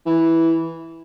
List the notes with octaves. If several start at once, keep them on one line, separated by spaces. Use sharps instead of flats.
E3